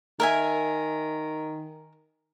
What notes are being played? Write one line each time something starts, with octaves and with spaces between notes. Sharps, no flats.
D#3 A#4 E5 G#5